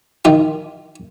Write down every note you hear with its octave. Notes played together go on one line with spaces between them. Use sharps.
D#3 F4